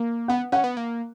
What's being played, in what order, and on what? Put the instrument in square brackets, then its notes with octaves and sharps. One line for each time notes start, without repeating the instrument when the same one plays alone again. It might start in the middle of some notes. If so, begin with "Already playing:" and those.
Already playing: [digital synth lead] A#3
[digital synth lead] B3 [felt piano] F#5
[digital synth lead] C#4 [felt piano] F#5
[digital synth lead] B3
A#3